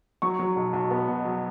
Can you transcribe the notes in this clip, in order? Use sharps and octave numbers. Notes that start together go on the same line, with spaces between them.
F#3 C#6
F#3
B1
B1
B3
B2
F#3